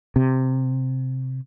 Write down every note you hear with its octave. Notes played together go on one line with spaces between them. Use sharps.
C3